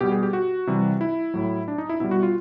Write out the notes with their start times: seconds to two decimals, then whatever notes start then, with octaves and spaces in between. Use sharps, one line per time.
0.01 B2 G3 G4
0.11 G#4
0.23 G4
0.33 F#4
0.67 C3 E3 G3
1.01 E4
1.34 A2 F#3
1.68 D4
1.78 D#4
1.89 E4
2.00 B2 G3 E4
2.11 F#4
2.23 F4